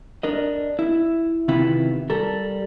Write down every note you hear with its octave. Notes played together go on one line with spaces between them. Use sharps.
D4 A#4 D#5
E4
C3 D#3 B3 E4 F4 B4
G3 A4 A#4